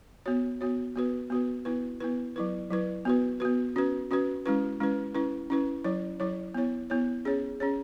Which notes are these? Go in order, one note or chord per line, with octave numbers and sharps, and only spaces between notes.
B3 F#4 C#5
B3 F#4 C#5
B3 F#4 B4
B3 F#4 B4
B3 E4 B4
B3 E4 B4
F#3 E4 B4
F#3 E4 B4
B3 F#4 B4
B3 F#4 B4
C#4 F#4 B4
C#4 F#4 B4
G#3 C#4 E4 B4
G#3 C#4 E4 B4
C#4 E4 B4
C#4 E4 B4
F#3 E4 C#5
F#3 E4 C#5
B3 E4 C#5
B3 E4 C#5
C#4 G#4 C#5
C#4 G#4 C#5